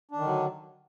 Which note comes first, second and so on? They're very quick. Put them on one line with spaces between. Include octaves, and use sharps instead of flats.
D4 D#3 D3 F#3